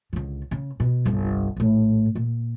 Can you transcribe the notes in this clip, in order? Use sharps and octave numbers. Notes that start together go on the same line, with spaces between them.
C#2 D3
C#3
B2
G1 C2
A#1 A2
A#2